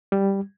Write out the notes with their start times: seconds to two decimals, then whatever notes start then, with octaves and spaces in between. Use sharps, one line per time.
0.12 G3